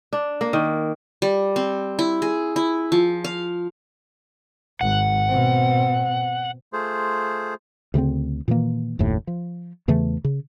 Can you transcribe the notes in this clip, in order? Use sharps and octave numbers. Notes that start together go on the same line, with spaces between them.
D4
A#3
D#3
G3
C4
E4
G#4
E4
F3
F5
G#1 F#5
B2 C4
A3 F4 G#4 C5
D2 C#3 A3 C4
A#2 D#3 E3 A#3
F#1 D#2 A2
F3
E2 C#3 E3 A3
C#3